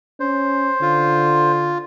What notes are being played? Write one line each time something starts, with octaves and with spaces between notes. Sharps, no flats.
C#4 C5
D3 F4